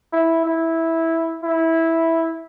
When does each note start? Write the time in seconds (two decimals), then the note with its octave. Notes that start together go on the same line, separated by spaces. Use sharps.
0.13 E4
0.46 E4
1.43 E4